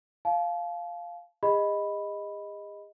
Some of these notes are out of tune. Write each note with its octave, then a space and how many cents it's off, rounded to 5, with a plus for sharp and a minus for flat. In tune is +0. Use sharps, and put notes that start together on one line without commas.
F5 +0 A5 -35
G#4 -45 D#5 +0 B5 +0